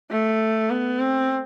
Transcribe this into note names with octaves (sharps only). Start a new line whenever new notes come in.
A3
B3
C4